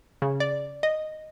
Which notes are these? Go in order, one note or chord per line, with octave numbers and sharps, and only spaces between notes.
C#3
D5
D#5